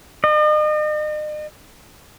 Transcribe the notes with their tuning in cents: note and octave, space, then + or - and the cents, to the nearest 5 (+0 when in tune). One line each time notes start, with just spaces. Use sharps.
D#5 -40